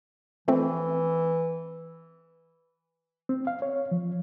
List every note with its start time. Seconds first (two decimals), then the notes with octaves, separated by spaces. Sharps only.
0.48 E3 F3 A3 C4
3.29 C4
3.47 F5
3.62 C#5
3.91 F3